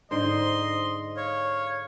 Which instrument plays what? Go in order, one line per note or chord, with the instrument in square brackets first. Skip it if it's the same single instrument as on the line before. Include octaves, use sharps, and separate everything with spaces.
[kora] G#2 D3 C5 [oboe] D#5 [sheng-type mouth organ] C6
[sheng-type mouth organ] C#5 [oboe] F5